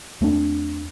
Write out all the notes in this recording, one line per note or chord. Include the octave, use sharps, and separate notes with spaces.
E2 A3 C4 D4